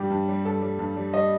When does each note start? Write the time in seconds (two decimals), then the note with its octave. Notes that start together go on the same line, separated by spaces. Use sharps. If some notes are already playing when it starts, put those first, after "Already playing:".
Already playing: G2 G3 G4
0.10 G2
0.28 G3
0.45 G2 A4
0.62 G3
0.79 G2
0.96 G3
1.14 G3 D#5